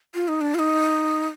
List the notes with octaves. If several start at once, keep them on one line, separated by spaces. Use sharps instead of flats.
F4
D#4
D4
F4
D#4